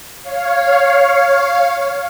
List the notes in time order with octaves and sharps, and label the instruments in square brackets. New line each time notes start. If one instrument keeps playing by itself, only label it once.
[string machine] C#5 F5